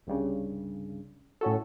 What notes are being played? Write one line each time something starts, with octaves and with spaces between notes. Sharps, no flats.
C2 G2 C#3
A2 C#4 F#4 A4